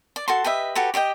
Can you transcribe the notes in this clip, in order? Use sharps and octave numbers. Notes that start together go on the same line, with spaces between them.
D5
F#4 A4 A5 C6
G4 B4 D#5 E5
F#4 G4 A4 B4
G4 D5 D#5 G5